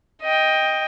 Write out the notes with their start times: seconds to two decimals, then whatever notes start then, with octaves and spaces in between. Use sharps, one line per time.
0.22 D#5 G5